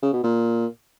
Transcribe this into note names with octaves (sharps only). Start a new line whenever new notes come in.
C#3
B2
A#2